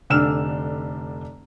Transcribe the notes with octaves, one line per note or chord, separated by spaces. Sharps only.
F1 D3 D4 E6 F6 E7